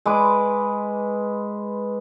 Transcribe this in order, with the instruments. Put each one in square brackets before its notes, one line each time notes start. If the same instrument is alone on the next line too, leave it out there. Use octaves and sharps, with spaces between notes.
[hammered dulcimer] G#3 B4 D6